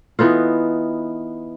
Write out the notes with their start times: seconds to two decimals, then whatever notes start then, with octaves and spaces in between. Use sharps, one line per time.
0.19 E3 B3 D#4 F4